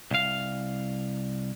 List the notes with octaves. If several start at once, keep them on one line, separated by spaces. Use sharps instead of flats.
C2 F5